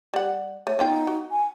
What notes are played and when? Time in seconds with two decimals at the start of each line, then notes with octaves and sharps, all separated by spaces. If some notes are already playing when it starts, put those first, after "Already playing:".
0.14 G3 F#5
0.67 A3 C#5
0.79 B3 D#4 F4 G5
1.07 F#4
1.31 G#5